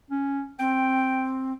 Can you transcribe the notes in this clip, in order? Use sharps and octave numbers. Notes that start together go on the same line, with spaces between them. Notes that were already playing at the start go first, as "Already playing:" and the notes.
C#4
C4 G5